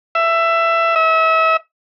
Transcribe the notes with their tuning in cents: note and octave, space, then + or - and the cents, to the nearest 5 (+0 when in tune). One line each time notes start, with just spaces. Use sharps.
E5 +15
E5 -35